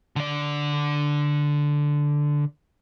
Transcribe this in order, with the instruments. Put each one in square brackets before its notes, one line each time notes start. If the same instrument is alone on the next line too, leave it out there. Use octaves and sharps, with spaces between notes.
[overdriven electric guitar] D3 D5